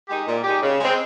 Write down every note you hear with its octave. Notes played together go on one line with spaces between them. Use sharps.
G#3 D#4 G4
A#2
G#3 D#4 G4
C#3
G#3 C4